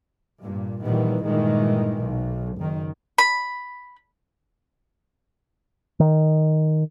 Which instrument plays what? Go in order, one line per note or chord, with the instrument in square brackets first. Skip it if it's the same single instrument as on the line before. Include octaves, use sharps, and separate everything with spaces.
[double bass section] G2 A#2
A#1 D#3 E3 G3 B3
G1 A#2 D#3 E3 G#3
B1
F#1 D#3
[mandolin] B5
[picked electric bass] D#3